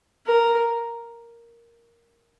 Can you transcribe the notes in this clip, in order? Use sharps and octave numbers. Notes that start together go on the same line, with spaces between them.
A#4